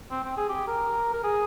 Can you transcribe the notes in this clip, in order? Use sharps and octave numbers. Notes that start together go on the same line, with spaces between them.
C4
C4
G#4
G4
A#4
A#4
G#4